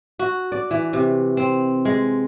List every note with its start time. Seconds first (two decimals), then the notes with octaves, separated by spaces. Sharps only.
0.19 F#4
0.52 D5
0.71 E3
0.93 C3
1.37 C4
1.85 G#3